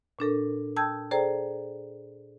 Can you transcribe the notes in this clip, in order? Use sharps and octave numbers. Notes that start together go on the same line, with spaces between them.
A#2 D4 A4 A#4
G5 A5 D#6 E6 G6 G#6
G#4 A4 C5 D5 G5 A#5